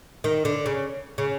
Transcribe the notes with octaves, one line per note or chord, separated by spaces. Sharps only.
D#3
D3
C#3
C#3